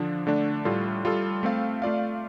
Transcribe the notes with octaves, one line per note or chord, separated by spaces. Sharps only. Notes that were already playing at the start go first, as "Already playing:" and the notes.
Already playing: D3 F3 D4
D3 A3 D4
A2 G3 F4 A4
G3 F4 A4
A3 C4 A4 F5
A3 F4 D5 F5